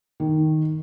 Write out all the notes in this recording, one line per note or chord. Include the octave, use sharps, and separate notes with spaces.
D#3